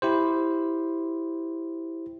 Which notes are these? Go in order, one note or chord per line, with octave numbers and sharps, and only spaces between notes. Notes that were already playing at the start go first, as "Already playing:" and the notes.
E4 G4 C5